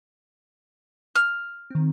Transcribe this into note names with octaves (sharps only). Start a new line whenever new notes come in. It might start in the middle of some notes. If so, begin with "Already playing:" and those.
F6
D#3 C4